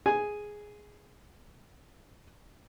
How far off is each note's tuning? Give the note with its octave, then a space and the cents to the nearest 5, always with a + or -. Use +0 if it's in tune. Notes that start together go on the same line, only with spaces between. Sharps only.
G#4 +0 G#5 +0